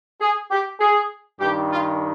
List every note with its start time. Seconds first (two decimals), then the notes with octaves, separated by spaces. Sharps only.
0.21 G#4
0.51 G4
0.80 G#4
1.40 G2 D#3 G4
1.70 F4